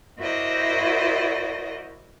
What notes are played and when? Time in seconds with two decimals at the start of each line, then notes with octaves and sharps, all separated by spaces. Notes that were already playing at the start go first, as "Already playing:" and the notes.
0.18 E4 F#4 A#4 C5 D5 D#5